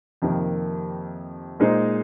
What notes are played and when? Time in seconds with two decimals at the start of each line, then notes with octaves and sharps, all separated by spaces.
0.22 F2 C3 D#3 A#3
1.60 A#2 G#3 D#4 G#4 C5